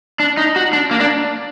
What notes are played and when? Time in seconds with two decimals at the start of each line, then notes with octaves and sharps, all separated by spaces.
0.20 D4
0.37 D#4
0.56 F#4
0.73 D4
0.91 A#3
1.00 D4